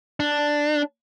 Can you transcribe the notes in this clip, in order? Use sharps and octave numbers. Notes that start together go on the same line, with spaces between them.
D4